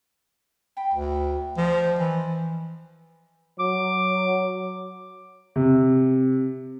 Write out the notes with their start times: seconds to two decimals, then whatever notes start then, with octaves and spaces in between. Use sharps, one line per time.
0.77 G5 B5
0.94 D2
1.57 F3 C5 D5 D#5
1.99 E3
3.59 F#3 D6
5.56 C3